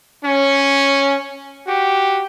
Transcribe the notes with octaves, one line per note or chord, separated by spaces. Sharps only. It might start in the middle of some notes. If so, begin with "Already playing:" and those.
C#4
F#4 G4